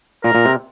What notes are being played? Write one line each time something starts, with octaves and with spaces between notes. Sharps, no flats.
A#2 A#4
A#2
C3